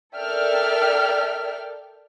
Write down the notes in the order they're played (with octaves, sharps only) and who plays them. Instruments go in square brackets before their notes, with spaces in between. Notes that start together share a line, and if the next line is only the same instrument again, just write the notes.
[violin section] A4 A#4 D5 E5 G5 F6